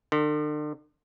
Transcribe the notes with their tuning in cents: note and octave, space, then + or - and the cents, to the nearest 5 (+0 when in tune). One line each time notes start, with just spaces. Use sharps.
D3 +40